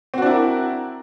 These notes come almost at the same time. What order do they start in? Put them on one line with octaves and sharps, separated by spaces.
C4 F#4 D4 E4 A#4